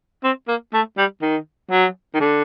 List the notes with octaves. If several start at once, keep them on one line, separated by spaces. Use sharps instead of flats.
C4
A#3
A3
G3
D#3
F#3
D#3
D3